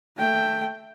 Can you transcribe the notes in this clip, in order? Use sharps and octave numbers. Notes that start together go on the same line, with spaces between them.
A3 G5